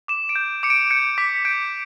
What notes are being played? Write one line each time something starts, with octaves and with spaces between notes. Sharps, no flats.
D6 E7
D7
G6
D6 C#7
D7
G6 C#7
D6 B6
G6 D7